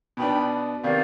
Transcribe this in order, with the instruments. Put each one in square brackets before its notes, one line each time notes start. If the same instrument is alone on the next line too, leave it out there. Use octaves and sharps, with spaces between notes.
[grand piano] B2 B3 D4 [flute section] G5 B5
[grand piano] C3 D#3 B3 [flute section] D5 F5